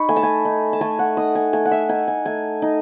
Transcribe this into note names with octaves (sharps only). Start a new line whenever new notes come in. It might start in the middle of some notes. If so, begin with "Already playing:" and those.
Already playing: D#4 B5 C#6
A3 G#5
A5
G#5
D#4
A5
A3 G#5
F#5
D#4 D#6
G#5
A3 G#5
F#5
E5
D#4 G#5
G#5
A3 G#5
D#4